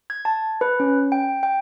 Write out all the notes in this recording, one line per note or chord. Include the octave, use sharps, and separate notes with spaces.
G#6
A5
B4
C#4
G5
G5